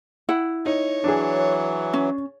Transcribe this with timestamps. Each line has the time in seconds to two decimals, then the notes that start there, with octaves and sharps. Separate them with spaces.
0.29 E4 F#5
0.66 D#4 C#5
1.04 E3 F#3 D4 G#4
1.93 C#4